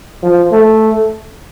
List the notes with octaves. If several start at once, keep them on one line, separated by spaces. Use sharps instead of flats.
F3
A3